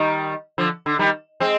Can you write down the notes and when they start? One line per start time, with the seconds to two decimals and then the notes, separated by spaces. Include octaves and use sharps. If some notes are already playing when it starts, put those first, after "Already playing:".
Already playing: D#3 G3
0.58 D3 F3
0.86 D3
0.99 D#3 G3
1.40 G#3 C4